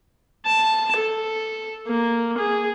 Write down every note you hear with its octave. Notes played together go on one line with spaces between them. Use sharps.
A5
A4
A#3
G#4